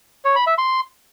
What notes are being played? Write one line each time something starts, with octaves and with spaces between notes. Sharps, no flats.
C#5
B5
E5
C6